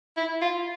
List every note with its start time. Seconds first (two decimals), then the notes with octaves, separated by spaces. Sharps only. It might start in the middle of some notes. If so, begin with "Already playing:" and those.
0.17 E4
0.42 F4